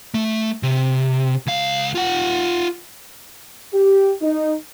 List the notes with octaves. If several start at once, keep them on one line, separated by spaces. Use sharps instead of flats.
A3
C3
C#2 F5
F4 F#5
G4
D#4